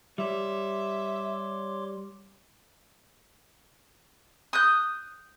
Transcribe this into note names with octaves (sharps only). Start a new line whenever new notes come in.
G3 C#5 E5 C6 D6
D#6 F#6 G6